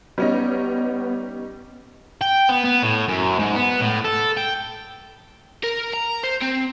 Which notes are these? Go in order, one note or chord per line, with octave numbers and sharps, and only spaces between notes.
G3 B3 C#4 D#4
G5
B3
B3
A2
F#2
G#2
B3
A2
A4
G5
A#4
A#5
C5
C4